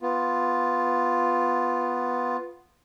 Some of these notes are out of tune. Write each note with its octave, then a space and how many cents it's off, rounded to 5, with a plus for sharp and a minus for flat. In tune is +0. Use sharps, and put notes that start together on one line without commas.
B3 +0 F4 +0